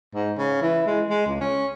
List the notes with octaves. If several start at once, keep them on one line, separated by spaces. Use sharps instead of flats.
G#2
C#3
E3
G#3
G#3
C#2
C#4